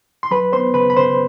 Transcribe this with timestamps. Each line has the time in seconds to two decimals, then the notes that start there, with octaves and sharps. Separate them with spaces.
0.23 C6
0.31 F#3 B4 B5
0.53 B3 C5 C6
0.74 C#3 B4 B5
0.90 B5
0.96 C#3 C5 C6